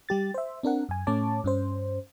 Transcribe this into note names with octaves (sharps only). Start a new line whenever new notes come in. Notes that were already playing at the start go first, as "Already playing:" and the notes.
G3 G4 A6
C5 E5
C4 D4 A#4 F#5
F#2 G#5
A2 A3 C#4 C#5 A5 D6
G2 C#4 C5